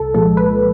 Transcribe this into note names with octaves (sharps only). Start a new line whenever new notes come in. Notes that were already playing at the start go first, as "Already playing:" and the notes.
Already playing: C2 A4
A#2 F3 G#3 A4
B4